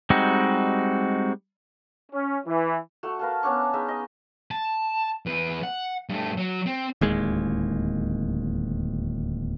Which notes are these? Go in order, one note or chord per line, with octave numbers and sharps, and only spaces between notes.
G3 G#3 C4 D#4 F#4
C#4
E3
A3 F#4
A#4 B4 F5 A5
B3 C#4 D4 C#6
G#3 D#4 E5
D#5
A5
E2 B4
F#5
G2 A3
F#3
C4
D1 D#2 G#3